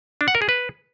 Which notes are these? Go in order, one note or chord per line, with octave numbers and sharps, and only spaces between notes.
D4
F#5
A#4
G#4
B4